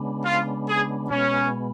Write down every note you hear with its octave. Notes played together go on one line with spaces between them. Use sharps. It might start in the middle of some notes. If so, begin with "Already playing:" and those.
Already playing: C#3 G#3 B3 D4
F4
G#4
B2 G#3 B3 C#4